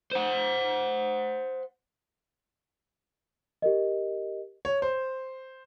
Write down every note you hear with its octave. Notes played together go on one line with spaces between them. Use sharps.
C5 F#5
G4 A#4 D#5
C#5
C5